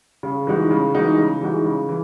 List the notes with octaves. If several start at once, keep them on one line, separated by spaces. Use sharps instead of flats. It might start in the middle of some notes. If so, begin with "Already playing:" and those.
C#3
E3 G#3 D#4 F#4
C#3
E3 G#3 D#4 F#4
C#3
E3 G#3 D#4 F#4
C#3
E3